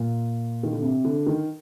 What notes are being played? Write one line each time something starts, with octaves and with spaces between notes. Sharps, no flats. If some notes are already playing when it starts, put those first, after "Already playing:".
Already playing: A#2
D#3
D3
C3
D3
D#3